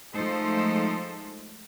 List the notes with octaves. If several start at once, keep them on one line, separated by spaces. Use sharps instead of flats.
F3 G#3 A3 D#4 A4 C5